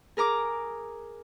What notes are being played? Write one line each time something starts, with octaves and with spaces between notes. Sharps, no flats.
G#4 A#4 A#5 D6